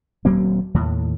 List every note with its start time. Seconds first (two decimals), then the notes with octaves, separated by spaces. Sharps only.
0.25 D#1 F#3 A#3 C4
0.74 D#2 A2